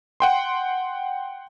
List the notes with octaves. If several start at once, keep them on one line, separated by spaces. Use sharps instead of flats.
F#5 G5 C6